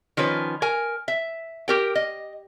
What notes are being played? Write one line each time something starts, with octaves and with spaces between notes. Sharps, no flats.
D#3 F3 C#4 B4
A#4 G#5
E5
G4 A#4 G5
D#5